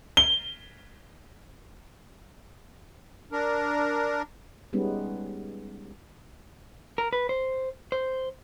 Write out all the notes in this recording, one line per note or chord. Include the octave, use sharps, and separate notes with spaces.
G7
D4 A#4
G3 G#3 B3 C#4 D#4
A#4
B4
C5
C5